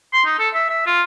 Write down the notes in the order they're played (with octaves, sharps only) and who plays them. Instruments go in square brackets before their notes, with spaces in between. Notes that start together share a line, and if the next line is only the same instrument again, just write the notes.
[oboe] C6
D#4
A4
E5
E5
F4